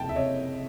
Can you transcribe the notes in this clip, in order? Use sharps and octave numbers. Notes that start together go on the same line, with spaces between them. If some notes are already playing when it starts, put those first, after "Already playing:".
Already playing: F#1 F2 C3 G5 A5
E5
C3 C#5 D#5